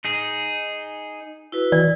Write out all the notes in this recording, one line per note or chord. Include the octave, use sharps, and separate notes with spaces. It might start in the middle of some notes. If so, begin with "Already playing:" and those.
D#4 G#4
E4 F#4 B4
E3 D5